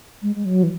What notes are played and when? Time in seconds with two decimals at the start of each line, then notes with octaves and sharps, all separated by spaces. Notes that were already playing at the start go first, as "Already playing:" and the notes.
0.22 G#3
0.36 G#3
0.45 F#3
0.63 E3